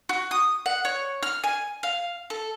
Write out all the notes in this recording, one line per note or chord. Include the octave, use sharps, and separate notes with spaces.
F#4
D#6
F#5
C#5
F6
G#5
F5
A4